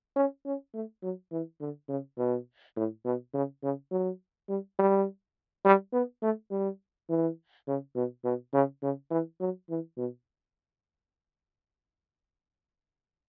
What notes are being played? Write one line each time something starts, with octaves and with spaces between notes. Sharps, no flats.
C#4
C#4
A3
F#3
E3
D3
C#3
B2
A2
B2
C#3
C#3
F#3
G3
G3
G3
B3
A3
G3
E3
C#3
B2
B2
C#3
C#3
E3
F#3
E3
B2